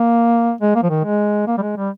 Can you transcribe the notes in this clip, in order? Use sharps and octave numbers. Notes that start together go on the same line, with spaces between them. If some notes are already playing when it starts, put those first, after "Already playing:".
Already playing: A#3
G#3
A#3
F3
D#3
G#3
A#3
G3
G#3
G3